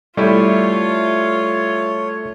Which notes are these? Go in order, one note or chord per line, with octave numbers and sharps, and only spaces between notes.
G3 A3 E4 F4 C#5